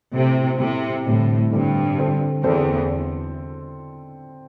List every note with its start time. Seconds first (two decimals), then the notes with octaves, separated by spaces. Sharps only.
0.13 A2 C3 A3 E4
0.59 A2 C3 A3 E4
1.06 A2 D3 G3 C4
1.51 G2 D3 G3 C4
1.98 D3 C4 A4 C5
2.44 E2 D3 C4 A4 C5